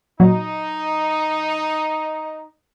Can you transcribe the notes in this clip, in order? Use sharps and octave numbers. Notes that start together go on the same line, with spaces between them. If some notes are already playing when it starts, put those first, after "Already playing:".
A#2 F#3 D#4